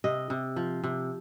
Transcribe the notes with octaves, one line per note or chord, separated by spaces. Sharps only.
C3 D#5
C3
F3
C3